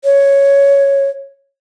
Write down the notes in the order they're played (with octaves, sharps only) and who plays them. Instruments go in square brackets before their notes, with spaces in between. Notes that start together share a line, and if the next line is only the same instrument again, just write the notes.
[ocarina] C#5